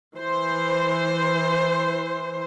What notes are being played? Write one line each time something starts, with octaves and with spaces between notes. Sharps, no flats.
E3 C5